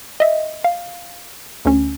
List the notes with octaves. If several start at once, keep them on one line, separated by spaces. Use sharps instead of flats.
D#5 E5
F5
D2 C#4